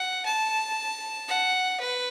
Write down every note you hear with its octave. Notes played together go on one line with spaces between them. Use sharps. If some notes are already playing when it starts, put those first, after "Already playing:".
Already playing: F#5
A5
F#5
B4